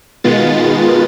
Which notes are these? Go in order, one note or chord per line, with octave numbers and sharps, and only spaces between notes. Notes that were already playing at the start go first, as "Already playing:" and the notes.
B2 D#3 G#3 B3 F4 A6